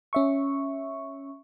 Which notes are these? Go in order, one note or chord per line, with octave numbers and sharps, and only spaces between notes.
C#4 E5 C#6